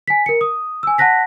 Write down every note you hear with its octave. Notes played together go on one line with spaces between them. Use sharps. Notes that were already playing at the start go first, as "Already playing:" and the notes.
G#5 B6
A#4 C#7
D#6
G#5 E6
F#5 A5 F#6 A#6 B6